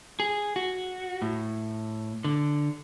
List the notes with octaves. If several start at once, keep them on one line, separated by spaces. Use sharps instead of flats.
G#4
F#4
A2
D3